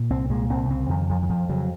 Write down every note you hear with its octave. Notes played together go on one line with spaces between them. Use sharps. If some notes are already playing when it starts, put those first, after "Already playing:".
Already playing: A#2
C2 C4
A#2 G#3
C2 C4
C#3 C4
F2 D#3
F2 F3
D#3
F2 F3
C#3 F#3